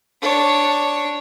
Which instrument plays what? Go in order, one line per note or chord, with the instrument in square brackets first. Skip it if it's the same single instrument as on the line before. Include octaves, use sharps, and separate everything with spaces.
[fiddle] D4 C#5